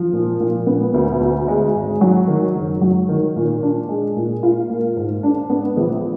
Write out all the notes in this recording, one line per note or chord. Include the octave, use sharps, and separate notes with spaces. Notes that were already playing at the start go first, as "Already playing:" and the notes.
Already playing: F3
A#2
A#2
B3
D2
D2
G#3
G#1
F#3
D#3
F#1
F#3
D#3
A#2
D4
G#3
A#2
F4
A#3
G#2
D4
B3
A#1